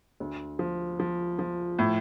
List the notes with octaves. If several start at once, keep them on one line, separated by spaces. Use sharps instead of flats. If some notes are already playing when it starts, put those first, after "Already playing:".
D2
F3
F3
F3
A2